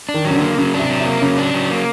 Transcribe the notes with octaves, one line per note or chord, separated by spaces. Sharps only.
D4
D#3
F#3
C#3
D3
A#3
C#3 F#3
C3 D4
F#3
C3
A#3
C#3 F#3
D4
F#3
A#3